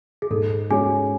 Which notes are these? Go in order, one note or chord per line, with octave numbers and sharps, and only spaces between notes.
G#4
G#2 A4
G#3 C#4 F#4 G#4 C#5 G#5